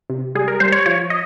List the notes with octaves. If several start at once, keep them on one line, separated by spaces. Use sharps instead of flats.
C3
G3 G#4
A#4
G3 C5
C#5
F3 C#5
D#5